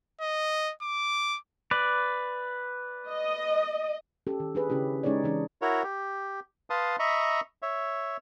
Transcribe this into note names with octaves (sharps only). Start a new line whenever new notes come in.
D#5
D6
B4 D5
D#5
C#4 G4 A4
D#3
D4 G#4 B4
C#3 C#4 E4 G4
G#3 C#4 D#4 G#4 C#5 D5
C#3 E3 C#4 D4
E4 F#4 A#4 C#5
G4
B4 F5 A5 C6 D#6
D#5 E5 A#5 B5 C#6
C#5 E5